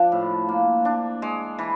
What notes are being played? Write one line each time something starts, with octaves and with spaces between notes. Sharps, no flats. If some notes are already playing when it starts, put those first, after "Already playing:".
Already playing: F3 D4
A2
A#3
D4
G#3
E3